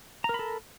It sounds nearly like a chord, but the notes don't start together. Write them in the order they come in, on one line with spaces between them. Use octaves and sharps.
A#5 A#4 B5 A4